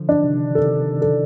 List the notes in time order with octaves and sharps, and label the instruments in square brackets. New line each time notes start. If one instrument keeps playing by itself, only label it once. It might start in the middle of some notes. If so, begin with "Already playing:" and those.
Already playing: [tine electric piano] D3 F3
[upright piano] D4
[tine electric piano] C3 D#3
[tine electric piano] C3 D#3 [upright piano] A4
[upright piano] A4